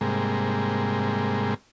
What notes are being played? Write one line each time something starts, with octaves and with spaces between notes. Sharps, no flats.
G#2 C3 G3 G#3 A#3